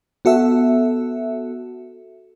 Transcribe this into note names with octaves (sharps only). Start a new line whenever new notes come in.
B3 F#4 A4 E5